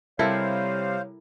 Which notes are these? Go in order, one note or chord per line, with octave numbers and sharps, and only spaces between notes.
C3 G3 E4 A4 A#4 C5 C#5 F5